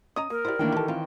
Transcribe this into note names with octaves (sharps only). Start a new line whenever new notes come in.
C#4 D#5 A#5 D#6
A#3 A#4
E4 G4 C5 D5
D#3 E3 A#3 D4 G5
G4 A4 B4 A5
C4 F4 F5